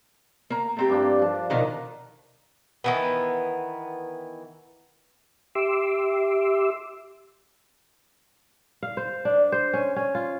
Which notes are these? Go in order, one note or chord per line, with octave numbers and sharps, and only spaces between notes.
A#3 A#5
A3 C4 G4
G2 D4 F4
F3 A5
B2 D#3 D#4 A#4
D#3 E3 B3
G4 E5 C6 D6 E6
F5
C5
D4
C5
C#4
C#4
F4